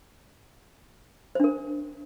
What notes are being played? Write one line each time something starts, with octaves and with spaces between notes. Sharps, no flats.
D4 A#4 C5